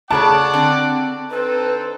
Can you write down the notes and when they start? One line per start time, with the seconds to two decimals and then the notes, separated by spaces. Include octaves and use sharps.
0.11 C#3 G#4 A4 C#5 D5 F#5 A5 D6
0.54 D3 C4
1.30 C4 D#4 A4 B4